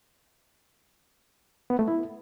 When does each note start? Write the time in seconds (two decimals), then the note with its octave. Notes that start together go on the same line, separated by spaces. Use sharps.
1.70 B3
1.79 A3
1.88 E4